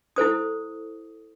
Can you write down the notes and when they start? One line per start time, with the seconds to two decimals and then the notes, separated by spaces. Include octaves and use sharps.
0.16 E4 A4 C5 D#6